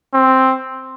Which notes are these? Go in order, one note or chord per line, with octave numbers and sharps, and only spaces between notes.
C4